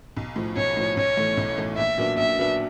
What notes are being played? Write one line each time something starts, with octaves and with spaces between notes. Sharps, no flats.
B1
A2 F3
B1 C#5
A2 F3
B1 C#5
A2 E3 A3
B1
A2 E3 A3
A#1 E5
A#2 F#3 B3 D4
A#1 E5
A#2 F#3 B3 D4